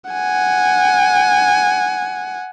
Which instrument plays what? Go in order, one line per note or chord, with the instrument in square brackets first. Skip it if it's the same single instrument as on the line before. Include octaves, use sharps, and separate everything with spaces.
[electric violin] F#5 G#5